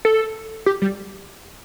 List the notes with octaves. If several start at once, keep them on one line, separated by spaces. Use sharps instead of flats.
A4
G4
G3